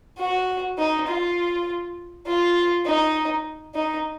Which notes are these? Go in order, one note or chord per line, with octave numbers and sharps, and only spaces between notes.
F#4
D#4
F4
F4
D#4
D#4